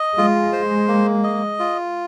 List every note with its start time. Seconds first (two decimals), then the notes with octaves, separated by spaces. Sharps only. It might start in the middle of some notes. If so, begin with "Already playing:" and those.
Already playing: D#5
0.17 G#3 F4
0.52 C5
0.88 A#3
1.24 D#5
1.59 F4